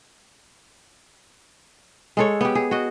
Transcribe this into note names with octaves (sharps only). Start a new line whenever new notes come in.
G#3 A4 C#5
B3 G4
G#4
F#4 D#5